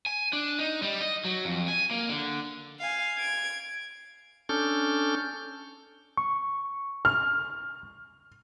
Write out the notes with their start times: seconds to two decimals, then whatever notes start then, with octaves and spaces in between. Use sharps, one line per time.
0.06 G#5
0.33 D4
0.59 D#4
0.82 G3
1.01 D#5
1.25 F#3
1.45 F2
1.68 G#5
1.91 A#3
2.09 D3
2.80 F5 G#5
3.17 G#6 D7
4.49 C#4 D4 A4 F6 G6
6.17 C#6
7.05 F6